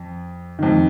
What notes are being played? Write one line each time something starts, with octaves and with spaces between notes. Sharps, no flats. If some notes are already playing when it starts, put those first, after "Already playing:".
Already playing: F2
F2 D#3